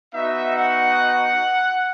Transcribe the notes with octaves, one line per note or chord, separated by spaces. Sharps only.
B3 D#4 F#4 E5
F#5